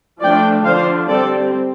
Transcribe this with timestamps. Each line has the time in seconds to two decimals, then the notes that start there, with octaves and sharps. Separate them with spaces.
0.21 F3 A3 D4 D5 G5
0.65 D3 F3 D4 C5 F5
1.08 G3 C4 A4 D5